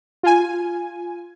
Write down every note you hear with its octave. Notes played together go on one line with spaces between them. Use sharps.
F4 G#5